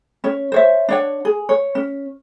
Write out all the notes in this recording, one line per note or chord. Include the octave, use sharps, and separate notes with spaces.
C#4 C#5
C5 C#5 E5
D4 C#5 F#5
G#4
C#5
C#4